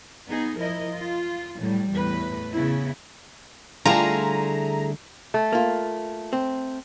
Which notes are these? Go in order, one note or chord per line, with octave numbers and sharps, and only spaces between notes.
B3 D#4 G#4
F3 E4 A#4 D#5
F4
A2 F#3 G3
E2 A2 B4
C#3 B3 E4
D3 G3 A3 E4 F4 G#4 A5 A#5
A3
A#3 F4
C4